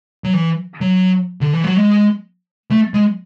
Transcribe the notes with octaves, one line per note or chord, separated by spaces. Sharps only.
F#3
E3
F#3
D3
E3
F#3
G#3
A3
G#3